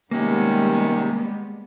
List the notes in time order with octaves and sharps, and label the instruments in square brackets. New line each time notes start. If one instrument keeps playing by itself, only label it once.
[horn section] C3 D#3 C#4 [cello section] G3 G#3 B3 [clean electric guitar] A#3